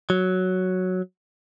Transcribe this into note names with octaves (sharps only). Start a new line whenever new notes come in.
F#3